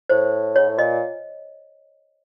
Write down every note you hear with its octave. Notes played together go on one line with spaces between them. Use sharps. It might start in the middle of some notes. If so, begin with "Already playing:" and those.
A2 C5
G#2 C#5
A2
A#2 D#5